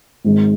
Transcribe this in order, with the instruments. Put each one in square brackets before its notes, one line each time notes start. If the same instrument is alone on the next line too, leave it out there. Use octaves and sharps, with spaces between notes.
[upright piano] G#1 G#2 D#3 G#3